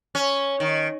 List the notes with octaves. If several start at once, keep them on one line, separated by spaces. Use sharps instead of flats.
C#4
D#3